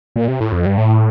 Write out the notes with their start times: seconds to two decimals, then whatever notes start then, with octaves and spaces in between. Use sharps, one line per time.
0.16 A#2
0.28 C3
0.40 A2
0.52 F2
0.66 G2
0.78 A2